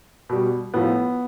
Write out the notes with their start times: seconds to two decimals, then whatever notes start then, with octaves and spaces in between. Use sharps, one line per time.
0.29 B2 G3
0.74 A2 F3 B3